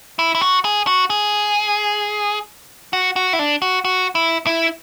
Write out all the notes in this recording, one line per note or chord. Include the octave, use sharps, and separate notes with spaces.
E4
E4
F#4
G#4
F#4
G#4
F#4
F#4
E4
D4
F#4
F#4
E4
E4